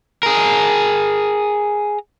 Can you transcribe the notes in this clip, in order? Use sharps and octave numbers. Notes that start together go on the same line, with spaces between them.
G#4 A#4